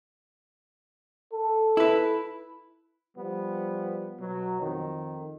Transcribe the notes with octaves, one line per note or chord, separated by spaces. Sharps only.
A4
E4 B4
F3 G3 B3
B2 F#3
F2 D#3